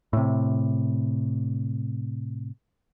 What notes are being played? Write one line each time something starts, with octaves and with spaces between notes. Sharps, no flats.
A2 C3